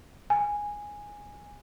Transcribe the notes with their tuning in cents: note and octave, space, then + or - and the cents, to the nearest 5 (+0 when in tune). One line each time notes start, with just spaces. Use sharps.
G#5 -5